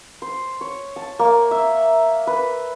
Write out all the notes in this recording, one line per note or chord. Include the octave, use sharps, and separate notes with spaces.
C5
C#5
A5
A#3
E5
B4